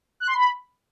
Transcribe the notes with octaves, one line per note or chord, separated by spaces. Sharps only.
F#6
C6
B5